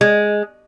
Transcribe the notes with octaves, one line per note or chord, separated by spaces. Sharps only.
G#3